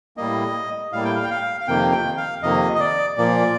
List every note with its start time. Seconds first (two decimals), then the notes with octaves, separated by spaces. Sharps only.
0.17 A2 G3 A#3 D#5
0.92 A2 G3 A#3 F5
1.05 G5
1.15 F5
1.24 G5
1.30 F5
1.61 F5
1.68 F2 C3 D#3 A#3 G5
1.92 G5
2.17 F5
2.42 F2 C3 D#3 A#3 D#5
2.75 D#5
2.80 D5
3.17 A#2 F3 A#3 D5